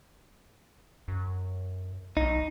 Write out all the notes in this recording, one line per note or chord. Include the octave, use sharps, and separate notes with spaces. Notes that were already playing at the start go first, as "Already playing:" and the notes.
F#2
B1 D#4